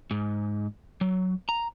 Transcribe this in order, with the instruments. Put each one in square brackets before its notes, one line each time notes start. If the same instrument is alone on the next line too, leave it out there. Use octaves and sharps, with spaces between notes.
[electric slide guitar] G#2
F#3
A#5